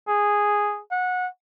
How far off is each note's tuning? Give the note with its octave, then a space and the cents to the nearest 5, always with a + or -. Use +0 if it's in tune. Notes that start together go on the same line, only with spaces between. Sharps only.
G#4 -5
F#5 -20